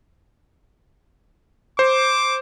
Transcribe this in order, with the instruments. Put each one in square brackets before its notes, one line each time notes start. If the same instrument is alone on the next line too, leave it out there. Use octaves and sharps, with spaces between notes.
[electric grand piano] C5 [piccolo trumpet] D6